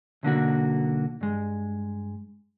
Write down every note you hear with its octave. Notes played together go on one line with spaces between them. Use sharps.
B1 D3 A#3 F#4
G2 G#3